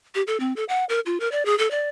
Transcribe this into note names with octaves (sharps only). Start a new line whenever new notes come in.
G4
A4
C4
A4
F#5
A#4
F4
A#4
D5
G#4
A4
D5